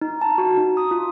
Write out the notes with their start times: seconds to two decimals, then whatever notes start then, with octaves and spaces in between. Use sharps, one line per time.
0.01 D#4
0.21 A5
0.38 F#4
0.57 D#4
0.77 D#6
0.91 F4